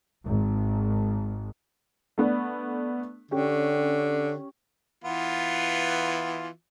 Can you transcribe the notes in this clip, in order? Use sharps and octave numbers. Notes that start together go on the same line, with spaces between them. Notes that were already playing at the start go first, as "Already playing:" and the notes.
G#1
A3 B3 D4
D3 C#4 G4
E3 B3 F4